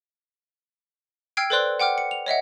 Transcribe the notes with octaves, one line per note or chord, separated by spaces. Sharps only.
G5 E6 F6 G#6 C7 D7
A4 B4 C5 D5 C6 F#6
F#5 G5 D6 F6
C#7
F7
C#5 D#5 E5 F#5